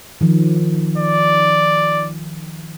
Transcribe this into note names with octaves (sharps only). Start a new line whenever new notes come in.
D#3 F3
D5